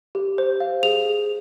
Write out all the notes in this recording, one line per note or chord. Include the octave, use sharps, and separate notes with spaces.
G4
C5
F5
G#4 F7
G#4